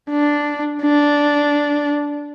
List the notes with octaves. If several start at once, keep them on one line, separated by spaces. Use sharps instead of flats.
D4
D4